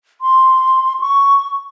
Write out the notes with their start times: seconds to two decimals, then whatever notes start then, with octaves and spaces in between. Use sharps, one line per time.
0.21 C6
1.00 C#6